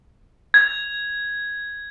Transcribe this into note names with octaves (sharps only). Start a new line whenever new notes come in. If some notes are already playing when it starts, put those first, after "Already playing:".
G#6